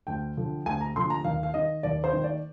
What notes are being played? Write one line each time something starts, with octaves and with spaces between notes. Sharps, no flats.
D2 G5
D3 F3
D2 G#5
A#5
D3 F3 C6
A#5
D#2 F5
F5
D#3 D#5
D#2 D5
C5
D#3
D5